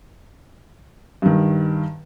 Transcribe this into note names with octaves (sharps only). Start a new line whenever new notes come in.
G2 D#3